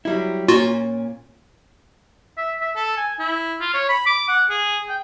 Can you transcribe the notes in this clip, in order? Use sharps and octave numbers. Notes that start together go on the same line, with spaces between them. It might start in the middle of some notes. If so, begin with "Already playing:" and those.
F#3 G3 E4
A#2 C#4 F4 F#4
E5
E5
A4
G#5
E4
F4
C#5
B5
D6
F#5
G#4
G5